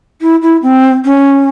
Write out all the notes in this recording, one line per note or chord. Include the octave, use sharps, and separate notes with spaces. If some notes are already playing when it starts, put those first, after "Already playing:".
E4
E4
C4
C#4